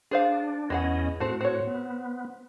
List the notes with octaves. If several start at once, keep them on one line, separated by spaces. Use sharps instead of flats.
D4 G#4 C5 F5
E2 E3 C#4 G#4 D#5 F#5
A2 A3 C4 F#4
C4 C#5
B3